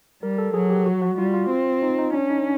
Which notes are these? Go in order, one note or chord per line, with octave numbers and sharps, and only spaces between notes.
G3 A#4
A4
F#3 G#4
G4
F#4
F#4
G3 F4
F4
C4
D#4
D#4
C#4 D4
D#4